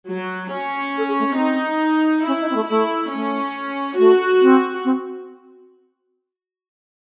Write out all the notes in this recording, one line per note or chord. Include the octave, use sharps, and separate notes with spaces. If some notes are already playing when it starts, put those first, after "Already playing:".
F#3
C#4
A4
G#4
A3
C4
D#4
C#4 E4
D#4
C4
A3
A3 E4
A3 C#4
A3 F#4
C4
C4